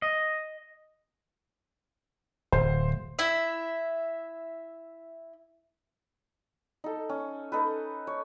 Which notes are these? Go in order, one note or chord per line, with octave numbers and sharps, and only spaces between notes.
D#5
D1 C5
E4 E5
D#4 A4
C#4
D#4 A4 B4
C#5